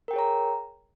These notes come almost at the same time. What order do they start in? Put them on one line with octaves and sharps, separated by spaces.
A#4 G5 G#4 C#5 A#5